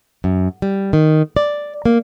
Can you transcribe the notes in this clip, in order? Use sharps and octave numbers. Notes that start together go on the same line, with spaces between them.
F#2
G3
D#3
D5
A#3